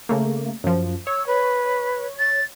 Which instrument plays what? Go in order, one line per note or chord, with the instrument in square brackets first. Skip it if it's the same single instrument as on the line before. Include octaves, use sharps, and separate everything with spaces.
[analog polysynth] C#3 A3 A#3
F#2 F3
[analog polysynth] C#5 [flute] E6
[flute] B4
A6